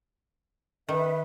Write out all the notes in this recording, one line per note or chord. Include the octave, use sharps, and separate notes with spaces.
D#3 B4 E5